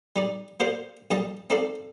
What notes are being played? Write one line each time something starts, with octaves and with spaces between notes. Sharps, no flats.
G3 D#4 D5
A#3 G4 C5 D5 F5
A#1 G3 D#5 A5
C4 D#4 A4 D5 F5